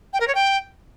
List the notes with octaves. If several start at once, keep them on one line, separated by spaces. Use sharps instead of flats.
G5
A#4
C#5
G5